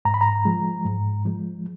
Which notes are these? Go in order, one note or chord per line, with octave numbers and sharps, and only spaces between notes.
G#2 A#5
B5
A#5
F3 G#3
G#2
F3 G#3